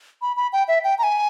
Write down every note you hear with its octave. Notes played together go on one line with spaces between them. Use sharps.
B5
B5
G5
E5
G5
A#5
G#5